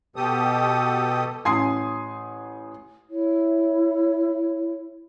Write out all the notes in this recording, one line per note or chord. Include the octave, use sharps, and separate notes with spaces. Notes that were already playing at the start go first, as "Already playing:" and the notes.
B2 G4 A4 D#6
A1 G#5 C6 D#6 C7
E4 C#5